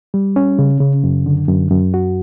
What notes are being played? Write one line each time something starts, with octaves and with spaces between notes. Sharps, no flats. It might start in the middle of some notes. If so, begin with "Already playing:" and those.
G3
C#4
C#3
C#3
F#2
D3
F#2
F#2
F#4